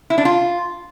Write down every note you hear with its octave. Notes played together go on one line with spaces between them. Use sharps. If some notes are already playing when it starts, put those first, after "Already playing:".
E4
D4
F4